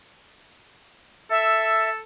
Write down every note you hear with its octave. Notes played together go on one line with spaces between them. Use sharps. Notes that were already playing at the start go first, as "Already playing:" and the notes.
A4 E5